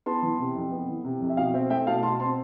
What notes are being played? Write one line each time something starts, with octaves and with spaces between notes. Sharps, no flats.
B3 A5 C6
E3
C3
F2
B3
E3
C3
F2
E5
B2 F5
C4 E5 G5
A3 E5 G5
B2 F5 A5
B2 A5 C6
C4 A5 C6